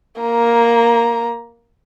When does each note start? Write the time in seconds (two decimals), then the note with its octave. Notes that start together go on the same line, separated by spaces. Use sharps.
0.22 A#3 A#5